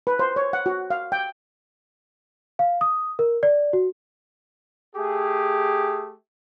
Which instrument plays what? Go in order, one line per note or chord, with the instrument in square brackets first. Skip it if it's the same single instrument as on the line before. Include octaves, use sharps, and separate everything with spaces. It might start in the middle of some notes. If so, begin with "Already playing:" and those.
[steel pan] B4
C5
C#5
F#5
F#4
F5
G5
[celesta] F5
D#6
A#4
D5
F#4
[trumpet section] A3 G4 G#4